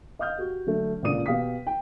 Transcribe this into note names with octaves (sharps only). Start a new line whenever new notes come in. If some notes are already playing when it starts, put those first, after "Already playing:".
D#5 F5 D#6 F6 G6
F#4 G4
D3 F#3 A3
C#2 A#2 D3 D5 D#6 D#7
B2 G4 F5 G5 D#6 B6
G5